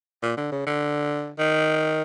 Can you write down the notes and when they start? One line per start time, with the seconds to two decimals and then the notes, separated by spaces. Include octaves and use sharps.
0.22 A#2
0.37 D3
0.52 C#3
0.66 D3
1.38 D#3